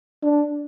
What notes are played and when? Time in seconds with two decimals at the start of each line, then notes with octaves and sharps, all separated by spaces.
0.23 D4